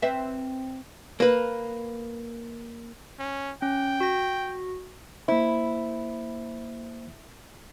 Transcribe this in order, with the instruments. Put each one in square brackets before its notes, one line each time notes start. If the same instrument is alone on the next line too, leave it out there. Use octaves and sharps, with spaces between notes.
[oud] C4 B4 E5
[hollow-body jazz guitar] A#3 B4
[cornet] C#4
[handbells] C#4 [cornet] G5
[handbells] F#4 A#6
[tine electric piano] A#3 C5 [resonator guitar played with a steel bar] E4